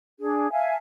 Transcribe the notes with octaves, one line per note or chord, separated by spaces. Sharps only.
D4 G#4
E5 F5 G#5 A5